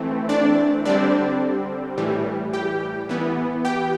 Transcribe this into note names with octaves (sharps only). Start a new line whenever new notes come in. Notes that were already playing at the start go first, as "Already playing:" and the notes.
Already playing: E3 A3 C4
D4 D5
D3 G3 C4 D4 D5
A2 E3 G3
G4 G5
E3 B3
G4 G5